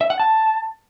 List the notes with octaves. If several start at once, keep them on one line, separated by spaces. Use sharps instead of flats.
E5
F#5
A5